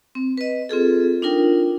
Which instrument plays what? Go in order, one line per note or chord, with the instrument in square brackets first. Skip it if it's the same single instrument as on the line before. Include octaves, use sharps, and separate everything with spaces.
[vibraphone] C4
B4 D#5
C4 F4 G#4 A4
D4 D#4 F4 A#4 G5